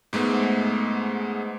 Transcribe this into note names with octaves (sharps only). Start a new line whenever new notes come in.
G#2 G#3 A3 B3